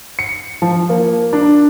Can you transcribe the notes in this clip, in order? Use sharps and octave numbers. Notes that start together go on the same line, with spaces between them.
C#7
F3
A#3
D4